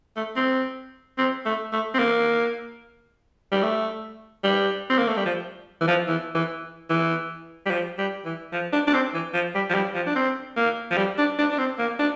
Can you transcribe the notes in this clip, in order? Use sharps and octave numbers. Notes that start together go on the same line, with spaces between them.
A3
C4
C4
A3
A3
C4
A#3
G3
A3
G3
C4
A#3
A3
G3
F3
E3
F3
E3
E3
E3
G3
F3
G3
E3
F3
D4
D4
C4
E3
F3
G3
F3
G3
F3
D4
C4
A#3
F3
G3
D4
D4
D4
C4
A#3
D4